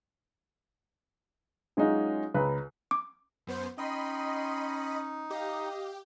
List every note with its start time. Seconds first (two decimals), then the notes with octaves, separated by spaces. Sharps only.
1.77 F#3 G#3 C#4 D#4 F4
2.34 C#2 B4 A#5
2.91 D6
3.47 F#2 B3 C5
3.78 C#4 D#4 D#5 G5 B5 C6 D#7
5.30 G4 D#5 F5